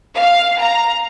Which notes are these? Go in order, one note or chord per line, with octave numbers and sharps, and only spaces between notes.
F5
A#5